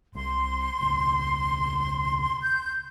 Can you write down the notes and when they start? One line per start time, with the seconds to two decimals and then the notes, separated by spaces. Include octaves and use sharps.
0.15 C2 C3 C6
0.81 E1 C#2
2.42 G6